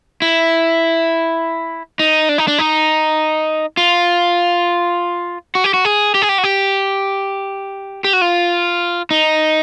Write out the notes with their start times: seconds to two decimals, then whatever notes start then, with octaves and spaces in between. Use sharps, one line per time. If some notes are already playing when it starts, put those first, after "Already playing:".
0.22 E4
1.99 D#4
2.29 D4
2.38 D#4
2.48 D4
2.59 D#4
3.77 F4
5.55 F#4
5.64 G4
5.74 F#4
5.85 G#4
6.14 G4
6.22 G#4
6.29 G4
6.38 F#4
6.44 G4
8.04 G4
8.13 F#4
8.21 F4
9.11 D#4